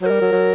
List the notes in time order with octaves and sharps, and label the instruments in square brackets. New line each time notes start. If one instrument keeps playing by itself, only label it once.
[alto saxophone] F#3 [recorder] C5
[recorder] A#4
[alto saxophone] G3
F#3
F#3